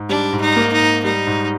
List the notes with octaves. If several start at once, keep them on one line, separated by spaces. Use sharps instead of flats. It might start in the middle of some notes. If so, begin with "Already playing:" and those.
Already playing: G#2
G3 D4
G#2
D#4
A#3
D#4
G#2
G3 D#4
G#2